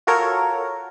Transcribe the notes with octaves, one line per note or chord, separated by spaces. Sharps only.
F4 F#4 A4 A#4 C#5